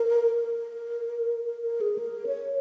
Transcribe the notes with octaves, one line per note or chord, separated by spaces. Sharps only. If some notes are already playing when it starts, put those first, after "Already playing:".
Already playing: A#4
A#4
A#4
A#4
G#4
A#4
C#5